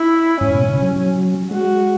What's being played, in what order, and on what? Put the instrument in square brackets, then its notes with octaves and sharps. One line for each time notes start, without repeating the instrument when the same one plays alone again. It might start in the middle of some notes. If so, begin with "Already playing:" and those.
Already playing: [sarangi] E4
[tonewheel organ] G#2 [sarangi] C#4
[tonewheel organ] B2
C#3
F#3
F#3
[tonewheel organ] G#3 [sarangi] F#4